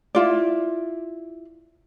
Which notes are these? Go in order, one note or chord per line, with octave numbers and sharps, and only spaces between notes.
E4 F4 D5